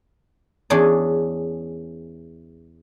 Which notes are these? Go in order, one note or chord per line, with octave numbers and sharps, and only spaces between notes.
E2 E3 C#4 D4 G#4 D5